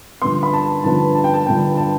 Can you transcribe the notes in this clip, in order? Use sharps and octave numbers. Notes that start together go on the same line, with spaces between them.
G2 D3 F3 B3 C6
B5
A5
G2 D3 F3 B3 A5
A5
G5
A5
G2 D3 F3 B3 G5
A5